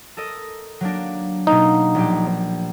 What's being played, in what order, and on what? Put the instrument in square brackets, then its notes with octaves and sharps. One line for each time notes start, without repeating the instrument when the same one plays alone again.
[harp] A4 A#4 D#5
F#3 A#3 D4
[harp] B2 A3 A#3 [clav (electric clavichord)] D#4
[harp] A#1 G4